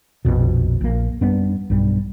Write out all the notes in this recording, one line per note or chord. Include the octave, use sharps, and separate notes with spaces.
A#1 F2 B2
A#1 A#3
F#2 G3 B3 D4
B1 G2 G3